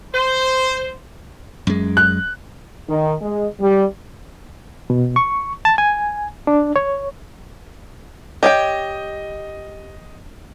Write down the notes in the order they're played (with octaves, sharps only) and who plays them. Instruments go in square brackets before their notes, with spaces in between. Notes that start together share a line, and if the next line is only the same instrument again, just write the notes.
[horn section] C5
[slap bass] F#2 G#3
[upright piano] F#6
[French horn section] D#3
G#3
G3
[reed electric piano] B2
C#6
A5
G#5
D4
C#5
[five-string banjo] G4 C#5 G5 [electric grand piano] D#5